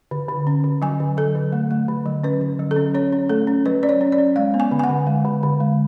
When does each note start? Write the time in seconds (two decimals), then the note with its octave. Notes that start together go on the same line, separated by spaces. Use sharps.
0.11 D3
0.29 D3
0.47 C#4
0.64 D3
0.82 F#3 G#5
1.00 D3
1.17 F#3 A4
1.35 D3
1.53 A3
1.71 A3
1.88 D3
2.06 F#3
2.24 C#4 B4
2.41 D3
2.59 F#3
2.71 A4
2.76 C#4
2.94 C#4 C#5
3.13 C#4
3.29 A3 A4
3.47 C#4
3.66 F#3 B4
3.83 C#4 D5
3.89 C#5
4.01 C#4
4.12 D5
4.18 C#4
4.36 G#3 F5
4.54 B3
4.60 G#5
4.71 D3
4.79 G#5
4.84 F#5
4.89 D3
5.07 G#3
5.25 D3
5.43 D3
5.60 G#3